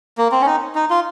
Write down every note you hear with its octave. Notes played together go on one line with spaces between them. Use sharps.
A#3
C4
C#4
D#4
D#4
F4